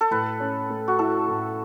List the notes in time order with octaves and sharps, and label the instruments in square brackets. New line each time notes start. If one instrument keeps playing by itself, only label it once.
[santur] A4
[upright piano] A2 [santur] B4
[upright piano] C#4
A3
[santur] F#4
[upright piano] E4 [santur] A4
[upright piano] A2